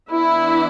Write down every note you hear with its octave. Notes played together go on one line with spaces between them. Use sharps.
E3 B3 D4 E4